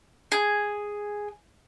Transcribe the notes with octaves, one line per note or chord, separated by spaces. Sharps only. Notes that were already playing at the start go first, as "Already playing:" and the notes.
G#4